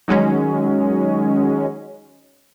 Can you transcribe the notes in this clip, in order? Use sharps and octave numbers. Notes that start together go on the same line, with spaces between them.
D#3 F#3 G#3 C#4